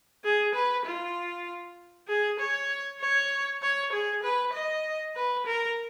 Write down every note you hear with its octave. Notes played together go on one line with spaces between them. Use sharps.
G#4
B4
F4
G#4
C#5
C#5
C#5
G#4
B4
D#5
B4
A#4